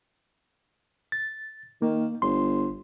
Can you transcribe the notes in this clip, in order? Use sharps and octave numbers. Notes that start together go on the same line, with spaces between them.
A6
D#3 A#3
G1 C6